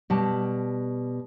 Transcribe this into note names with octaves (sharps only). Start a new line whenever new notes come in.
B2 G3 A5